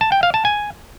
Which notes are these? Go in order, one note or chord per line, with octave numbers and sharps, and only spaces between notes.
A5
G5
F5
A5
G#5